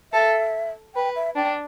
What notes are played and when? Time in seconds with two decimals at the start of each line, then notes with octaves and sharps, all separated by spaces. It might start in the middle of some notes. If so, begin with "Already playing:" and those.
0.12 A4 E5
0.95 B4 G5
1.16 E5
1.36 D4 G5